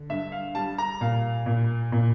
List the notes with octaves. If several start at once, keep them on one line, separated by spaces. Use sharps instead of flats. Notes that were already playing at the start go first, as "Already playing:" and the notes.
Already playing: D3
G2 E5
F5
G3 A5
A#5
A#2 F5
A#2
A#2